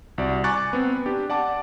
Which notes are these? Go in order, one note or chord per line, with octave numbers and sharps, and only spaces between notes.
C2 F#4 D5
G#5 A#5 C#6 D6 F#6 A6
B3 C4
D4 G4
D5 F#5 A5 D6